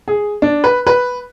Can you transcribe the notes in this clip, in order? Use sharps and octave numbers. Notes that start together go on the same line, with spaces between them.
G#4
D4
B4
B4